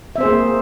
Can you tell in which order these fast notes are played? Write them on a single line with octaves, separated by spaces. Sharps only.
E5 C4 C5 G#4 A#3